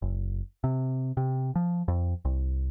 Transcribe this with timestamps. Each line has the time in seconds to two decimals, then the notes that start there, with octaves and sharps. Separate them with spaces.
0.02 F#1
0.64 C3
1.17 C3
1.56 F3
1.88 F2
2.25 C2